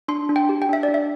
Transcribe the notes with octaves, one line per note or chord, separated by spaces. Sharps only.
D4 C6
D4
G5
G4
G5
D4 E5
D5
D4
E5